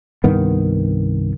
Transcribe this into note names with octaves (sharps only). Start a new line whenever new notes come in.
C2 G2 D#3 B3